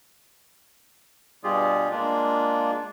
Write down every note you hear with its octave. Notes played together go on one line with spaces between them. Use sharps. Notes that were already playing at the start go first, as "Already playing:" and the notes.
G2 B2 G3 F4 G4 G#4
G#3 A#3 D4 F4